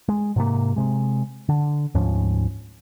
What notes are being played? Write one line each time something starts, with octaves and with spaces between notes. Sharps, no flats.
G#3
G#2 C3 A#3
C3 G#3
D3
D2 G#2 F3 C#4